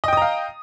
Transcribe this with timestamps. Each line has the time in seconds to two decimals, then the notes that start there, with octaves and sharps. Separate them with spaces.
0.04 D#5
0.08 G5
0.13 D#6
0.17 A#5
0.22 F5